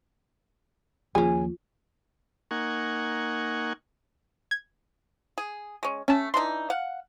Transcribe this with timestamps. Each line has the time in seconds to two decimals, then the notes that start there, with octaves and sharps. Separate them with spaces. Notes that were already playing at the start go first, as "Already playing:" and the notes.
1.15 D#2 F3 A#3 C#4 F4 G#4
2.51 A#3 D#4 F#5 G#5 C#6
4.51 G#6
5.38 G#4
5.83 G#3 C#4
6.08 A3 C#4 A5
6.34 E3 D4 D#4 C6
6.70 F5 F#5